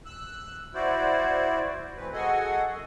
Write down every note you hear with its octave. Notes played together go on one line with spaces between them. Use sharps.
E6 F#6
E4 F#4 C5 D5
E3 A3 C4 B4
F#4 G#4 A4 D#5 F#5 G#5
F#2